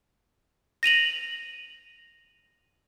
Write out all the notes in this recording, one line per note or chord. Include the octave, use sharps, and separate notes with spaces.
A#6 D#7 F7 F#7